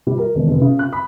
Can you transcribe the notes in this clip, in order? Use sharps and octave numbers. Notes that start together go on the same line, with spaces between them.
G3
A#4
E1
F1
C#3
F#6
B5